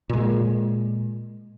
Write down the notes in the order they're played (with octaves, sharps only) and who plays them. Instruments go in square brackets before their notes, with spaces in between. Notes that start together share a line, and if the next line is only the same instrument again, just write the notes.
[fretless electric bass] A#2 G#3